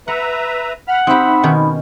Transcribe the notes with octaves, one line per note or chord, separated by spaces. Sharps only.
B4 E5 F#5 A#5
F#5 B5 F6
C4 D#4 G4 E5 B5
B2 D#3 C#4